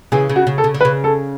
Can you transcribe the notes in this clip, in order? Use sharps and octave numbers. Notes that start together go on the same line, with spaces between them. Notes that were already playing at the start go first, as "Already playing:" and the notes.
C#3 E3 G#4
C#3
F#4
C#3
A4
C#3
D3
B4
C#3
A4